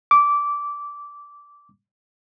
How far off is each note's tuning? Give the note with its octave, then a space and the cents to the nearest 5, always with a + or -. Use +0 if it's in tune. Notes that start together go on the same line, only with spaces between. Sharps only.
D6 -15